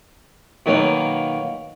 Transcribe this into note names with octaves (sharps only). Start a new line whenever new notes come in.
B2 D#3 F#3 A#3